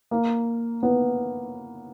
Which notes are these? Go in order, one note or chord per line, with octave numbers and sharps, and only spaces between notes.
A#3
B3